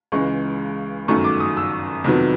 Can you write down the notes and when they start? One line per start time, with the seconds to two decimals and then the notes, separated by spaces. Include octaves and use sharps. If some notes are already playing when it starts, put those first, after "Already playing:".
0.12 C#2 C#3 E3 G#3 C#6
1.08 G1 F#2 D#3 F#3 A3 C#6
1.24 D6
1.40 D#6
1.57 E6
2.04 F2 C3 D#3 F#3 B3